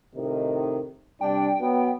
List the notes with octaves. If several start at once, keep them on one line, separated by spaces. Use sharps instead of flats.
A2 C3 D#3
C3 G3 D4 G5
F#3 B3